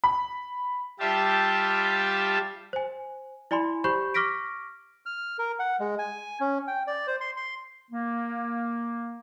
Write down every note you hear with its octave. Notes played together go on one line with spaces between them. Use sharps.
B5
G3 F4 G4 E5 A5
C5 G#5
E4 D5 G#5 B5 C6
G4 C5 B5 C#6 G6
C#6 D6 F6 A#6 B6 D7
F6
A#4
F#5
G#3
G#5
C#4
G5
D5
C5
C6
C6
A#3